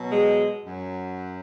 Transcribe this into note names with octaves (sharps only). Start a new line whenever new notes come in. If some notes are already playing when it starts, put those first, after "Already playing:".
Already playing: B2 F#3
G#3
F#2 F#3